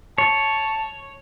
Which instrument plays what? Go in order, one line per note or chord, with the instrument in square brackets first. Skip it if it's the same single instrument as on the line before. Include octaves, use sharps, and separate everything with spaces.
[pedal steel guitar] C#5 [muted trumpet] A5